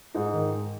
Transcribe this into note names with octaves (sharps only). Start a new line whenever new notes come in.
G#2 D#4
D#3